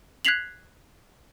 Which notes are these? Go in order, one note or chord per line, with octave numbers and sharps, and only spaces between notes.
F#6 G#6 B6 C7 F7 F#7